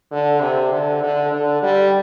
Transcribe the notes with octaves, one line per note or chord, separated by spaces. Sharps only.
D3
C3
D3
D3
D3
G3